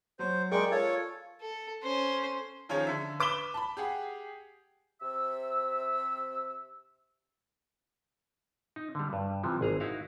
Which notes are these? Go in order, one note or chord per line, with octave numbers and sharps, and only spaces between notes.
F#3 C5
G#3 G#4 A#4 D5 G5 C#6
F4 A4 C#5
A4
C#4 C5
D#3 F3 C#4 G#4 C#5
D3 E5
B4 D6 B6 E7 G7
A5 B5
G4 G#4 F#5
C3 E5 E6
D#4
D3 G3
G2
C3 E3 F3
G#1 G#4 A#5
D#4 E4 F#4 F5